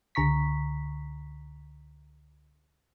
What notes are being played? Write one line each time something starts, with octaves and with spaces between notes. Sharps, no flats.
C#2 D3 A#5 C#6 B6